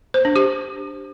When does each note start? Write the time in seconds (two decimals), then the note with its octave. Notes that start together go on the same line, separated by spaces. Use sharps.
0.14 C5
0.25 D4
0.36 G4